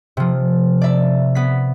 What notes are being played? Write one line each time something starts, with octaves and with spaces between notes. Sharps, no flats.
C3 F3
D5 E5
B3 B6